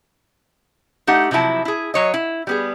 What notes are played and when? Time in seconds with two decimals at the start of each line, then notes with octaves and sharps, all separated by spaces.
1.07 A3 D#4 G4 F#5
1.31 C3 F3 F#3 E4 A5
1.65 E4 G#4
1.94 F#3 C#5 D#5
2.14 E4
2.47 G3 B3 G#4